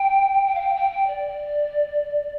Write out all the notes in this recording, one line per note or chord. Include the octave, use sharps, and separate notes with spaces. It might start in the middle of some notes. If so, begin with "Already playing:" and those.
Already playing: G5
G5
F5
G5
G5
G5
D5